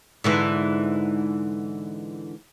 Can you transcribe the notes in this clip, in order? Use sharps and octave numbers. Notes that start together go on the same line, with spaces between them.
G#2 D3 E3